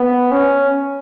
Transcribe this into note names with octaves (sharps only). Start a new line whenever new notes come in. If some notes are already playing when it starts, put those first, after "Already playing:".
Already playing: B3
C#4